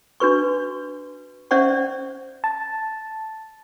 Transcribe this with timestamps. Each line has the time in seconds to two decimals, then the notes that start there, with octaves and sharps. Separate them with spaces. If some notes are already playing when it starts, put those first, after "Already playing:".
0.20 D4 F#4 B4 C#6
1.51 C#4 C5 D5 E5 F#5 C#6
2.44 A5